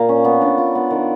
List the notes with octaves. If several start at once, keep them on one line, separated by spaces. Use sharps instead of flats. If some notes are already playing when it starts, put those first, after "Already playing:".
Already playing: A#2 A#3
C#4
B3
D4
F4
B3
D#3